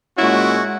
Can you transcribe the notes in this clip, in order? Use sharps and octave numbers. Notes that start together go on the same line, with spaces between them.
A#2 G#3 C#4 E4 F#4